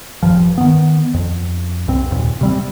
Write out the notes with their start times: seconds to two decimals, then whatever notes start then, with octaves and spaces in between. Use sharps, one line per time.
0.23 F1 C#2 G2 F3
0.58 D#3 B3
1.14 F2
1.88 C2 G2 C4
2.11 A1 D#2 A#2
2.41 C3 G3 C4